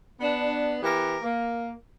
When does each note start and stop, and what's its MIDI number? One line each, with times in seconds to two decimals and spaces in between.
0.21 0.77 59
0.21 0.77 62
0.83 1.17 52
0.83 1.17 59
0.83 1.17 67
0.83 1.17 70
1.22 1.71 58